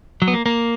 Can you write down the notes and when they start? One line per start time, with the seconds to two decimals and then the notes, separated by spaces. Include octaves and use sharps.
0.22 F#3
0.28 B3
0.34 A#3
0.46 A#3